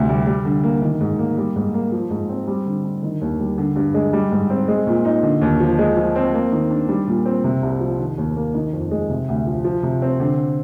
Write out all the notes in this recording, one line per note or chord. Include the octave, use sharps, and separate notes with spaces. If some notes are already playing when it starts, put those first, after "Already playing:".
Already playing: D2 C3
G3
G3
D3
A#3
D#3
G#2
A#3
G3
G#2
A#3
F3
G#2
C4
G3
D3
D4
D#3
D#2
G3
D3
G2
G#3
G3
G#2
C4
G#3
A#2
D#4
D3
D#2
F3
G#3
F3
C4
A#3
D#3
D4
G3
A#2
C4
C3
C2
F3
D#3
D#2
A#3
D#3
F2
G#3
C3
D2
F3
F3
C3
C4
D3